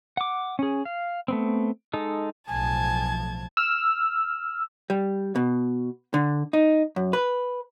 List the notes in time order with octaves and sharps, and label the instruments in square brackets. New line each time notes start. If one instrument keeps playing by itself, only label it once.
[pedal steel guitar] F#5 D6
C#4 G#4
F5
A3 B3 C4
G#3 D#4 A4
[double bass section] B1 A2 F3 [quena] G#5 [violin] A5 G#6
[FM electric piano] E6 F6
[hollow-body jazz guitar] G3
B2
D3
D#4
F#2
B4